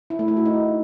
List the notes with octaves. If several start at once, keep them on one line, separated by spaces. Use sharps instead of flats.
E4
A3
E4
F#4
D#4